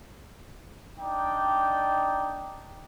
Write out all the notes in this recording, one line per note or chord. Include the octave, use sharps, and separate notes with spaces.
D4 D#4 D5 G5